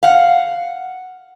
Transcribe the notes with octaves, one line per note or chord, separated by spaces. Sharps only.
F5 F#5